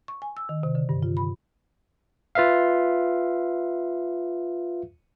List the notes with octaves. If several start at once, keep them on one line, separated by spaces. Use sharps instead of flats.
C#6
G#5
E6
D#3
C3
D3
G2
F4
B5
F4 B4 E5 F5